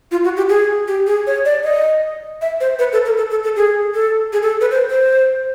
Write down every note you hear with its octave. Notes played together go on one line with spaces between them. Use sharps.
F4
F#4
G4
G#4
G4
G#4
C#5
D5
D#5
E5
C5
B4
A4
A#4
A4
A4
A4
G#4
A4
G#4
A4
B4
C5
C5